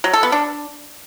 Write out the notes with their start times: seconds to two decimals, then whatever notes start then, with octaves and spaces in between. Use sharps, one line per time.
0.04 F#3
0.13 A4
0.23 B3
0.32 D4